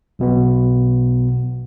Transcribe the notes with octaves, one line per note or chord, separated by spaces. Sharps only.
B1 B2 B3